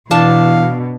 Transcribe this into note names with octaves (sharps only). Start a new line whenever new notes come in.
B2 E3 D4 F5 A5